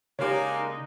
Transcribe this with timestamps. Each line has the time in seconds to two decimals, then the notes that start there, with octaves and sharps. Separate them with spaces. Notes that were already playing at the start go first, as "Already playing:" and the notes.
0.19 C#3 G#3 A#3 D4 D#4 G4 C#5